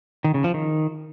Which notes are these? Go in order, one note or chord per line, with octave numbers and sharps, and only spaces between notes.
D#3
C#3
F3
D#3